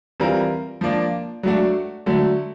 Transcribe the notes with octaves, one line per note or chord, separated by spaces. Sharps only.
E3 G3 C4 F4 A#4
F3 A#3 D4
F#3 A3 D4 F#4
D3 F#3 A3